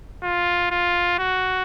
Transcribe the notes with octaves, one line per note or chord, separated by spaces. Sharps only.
F4
F4
F#4